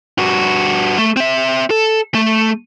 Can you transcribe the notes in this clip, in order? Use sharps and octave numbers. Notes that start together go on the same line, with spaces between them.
G2 F#4
A3
C4 E5
A4
A3